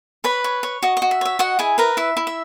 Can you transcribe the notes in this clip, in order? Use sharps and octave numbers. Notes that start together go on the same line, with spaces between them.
B4 C#5 B5
C#5
C#5
F#4 D#5
D#5
F#4
E5
C#5 E5
F#4 D#5 F#5
E4 G#4 G#5
A#4 B4 A#5
E4 E5
E4
E5